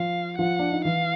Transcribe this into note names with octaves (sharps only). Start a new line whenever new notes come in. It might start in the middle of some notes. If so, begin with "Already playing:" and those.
Already playing: F3 F4 F5
F3 F4 F#5
D4
D#4
E3 E4 F5